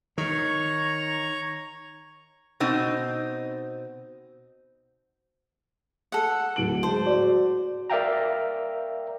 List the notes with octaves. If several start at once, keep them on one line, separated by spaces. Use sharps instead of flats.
D#3 C#5 A#5 C#6
B2 C4 D#4
A4 F#5
D1 D7 F#7
G#3 C5 A5
F#4 D5
A#4 D5 E5 F5 G5 A#5